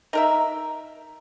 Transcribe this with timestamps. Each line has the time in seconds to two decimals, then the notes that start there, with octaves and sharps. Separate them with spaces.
0.13 D#4 A#4 E5